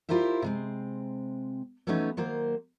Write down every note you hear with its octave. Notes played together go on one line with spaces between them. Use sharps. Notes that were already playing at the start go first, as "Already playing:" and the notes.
E4 F4 G4 A#4 C5 E5
C3 G#3 C4
E3 F#3 A3 B3 C#4 D#4
D#3 F#3 A#3 C5